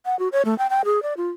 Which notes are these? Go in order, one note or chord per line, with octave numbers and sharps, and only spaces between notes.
F#5
F#4
C#5
A3
G5
G5
G#4
D5
F4